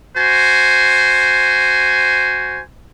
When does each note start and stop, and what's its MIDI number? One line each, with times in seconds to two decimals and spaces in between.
0.16 2.61 66
0.16 2.61 72
0.16 2.61 80